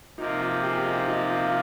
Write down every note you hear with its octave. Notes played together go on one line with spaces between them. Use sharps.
C3 F3 A#3 D#4
F4
G4
G#4
G4
D#4
D#4
F4
F4